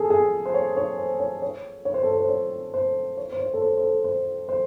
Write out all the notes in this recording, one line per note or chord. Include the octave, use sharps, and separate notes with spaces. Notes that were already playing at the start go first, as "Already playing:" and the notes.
Already playing: G#4 A4
G#4
C5
C#5
C#5
C5
C#5
C#5
C#5
C5
A4
C5
C5
C#5
C5
C#5
C5
C#5
A4
C5
C5
A4
C5
C5